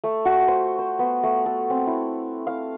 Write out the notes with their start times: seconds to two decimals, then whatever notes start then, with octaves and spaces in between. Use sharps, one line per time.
0.04 A3
0.25 F#4
0.48 C5
0.79 C5
0.99 B3
1.23 A3
1.46 A4
1.70 C4
1.87 E4
2.47 F5